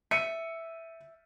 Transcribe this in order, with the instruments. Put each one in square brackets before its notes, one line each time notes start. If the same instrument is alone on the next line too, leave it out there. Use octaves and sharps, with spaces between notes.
[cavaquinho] E5 [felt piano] C#7 D#7